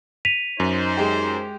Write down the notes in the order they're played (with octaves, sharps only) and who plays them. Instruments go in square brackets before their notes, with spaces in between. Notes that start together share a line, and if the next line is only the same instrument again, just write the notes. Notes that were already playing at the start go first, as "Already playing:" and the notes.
[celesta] B6 D#7 F7
[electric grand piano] F#2 [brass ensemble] D#4 C5
[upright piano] G#3 G4